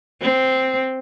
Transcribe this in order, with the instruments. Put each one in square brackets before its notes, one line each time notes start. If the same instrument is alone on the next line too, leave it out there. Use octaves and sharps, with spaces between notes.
[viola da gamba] C4